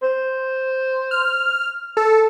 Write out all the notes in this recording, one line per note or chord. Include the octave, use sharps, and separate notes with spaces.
C5
F6
A4